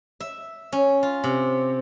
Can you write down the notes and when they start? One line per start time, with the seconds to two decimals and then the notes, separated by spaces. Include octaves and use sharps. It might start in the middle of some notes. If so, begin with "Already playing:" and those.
0.20 E5
0.72 C#4
1.03 F4
1.24 C3